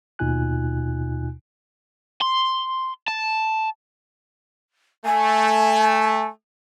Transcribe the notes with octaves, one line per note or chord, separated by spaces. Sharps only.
D#2 B2 D#4 F4 G#5 F#6
C6
A5
A3 G#5